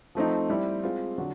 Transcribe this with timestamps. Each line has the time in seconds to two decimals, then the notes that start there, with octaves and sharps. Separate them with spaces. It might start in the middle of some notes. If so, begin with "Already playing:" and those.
0.15 F3 A3 C4 D#4
0.49 G3 C4 E4
0.83 G#3 C4 F4
1.18 D3 F#3